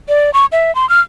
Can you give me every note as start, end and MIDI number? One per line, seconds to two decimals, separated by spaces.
0.09 0.33 74
0.34 0.46 85
0.52 0.74 76
0.75 0.88 84
0.89 1.01 89